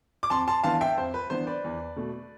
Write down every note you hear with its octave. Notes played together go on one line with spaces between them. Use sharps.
D6
F2 A5 C6
A5 C6
E3 B3 D4 F5 A5
E5 G5
F2 C5
B4
E3 B3 D4 C5
B4 D5
E2
B2 A3